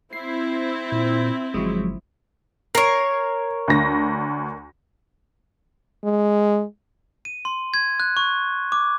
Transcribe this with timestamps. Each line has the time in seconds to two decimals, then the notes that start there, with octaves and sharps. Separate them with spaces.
0.13 C4 E4 C7
0.92 A#2
1.54 G1 F3 F#3 G#3
2.75 A#4 C#5 C7
3.68 D2 A#6
6.04 G#3
7.25 D#7
7.45 C6
7.74 G#6
8.00 F#6
8.17 C#6
8.72 D6